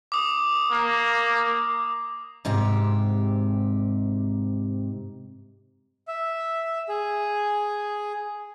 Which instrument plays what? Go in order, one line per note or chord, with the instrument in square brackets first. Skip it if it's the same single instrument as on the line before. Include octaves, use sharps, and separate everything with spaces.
[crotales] D6 D#6
[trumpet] A#3
[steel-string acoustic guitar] G#2 C3 G4
[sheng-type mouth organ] E5
G#4